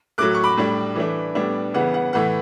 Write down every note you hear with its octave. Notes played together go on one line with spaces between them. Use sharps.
A2 F#3 A3 D6 F#6
C#6
B5 D6
A2 G3 D4
E3 A3 D4
A2 G3 B3 D4
C#3 E3 B3 F#5
F#5
A2 E3 A3 F#5